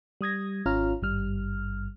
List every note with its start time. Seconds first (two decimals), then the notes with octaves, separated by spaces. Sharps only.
0.21 G3 D#6 G#6 A#6
0.66 G#1 C#4 F4 C#5 A#5 F6
1.02 G#1 G2 G3 F6